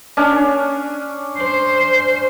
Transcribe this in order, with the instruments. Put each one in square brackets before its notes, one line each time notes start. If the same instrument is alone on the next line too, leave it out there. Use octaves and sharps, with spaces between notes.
[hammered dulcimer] C#4 D4
[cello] C5